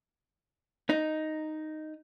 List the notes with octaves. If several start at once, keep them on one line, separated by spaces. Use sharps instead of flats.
D#4